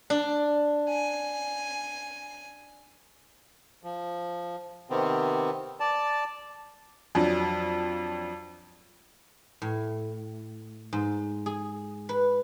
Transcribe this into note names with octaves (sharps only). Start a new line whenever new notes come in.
D4
G#5
F3
C3 D#3 B3 C4
D5 A5
F2 F3 F#3 D4
A2
G#2
G#4
B4